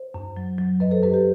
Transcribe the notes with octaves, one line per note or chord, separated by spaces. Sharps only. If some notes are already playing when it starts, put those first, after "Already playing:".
Already playing: C5
F#2
F#3
F#3
F#2 B4 D#5
A4 C5
F#2 G4 B4
G4 B4